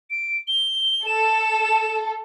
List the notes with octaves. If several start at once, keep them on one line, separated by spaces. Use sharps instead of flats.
D7
G7
A4 E7